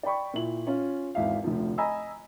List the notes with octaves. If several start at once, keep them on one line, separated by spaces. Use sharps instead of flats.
D5 G5 B5 C#6
A#2 E4 F#7
C#4 F4 C#5
G#1 E2 E5 F5
F1 D2 F3
D#5 G#5 A#5 B5 E6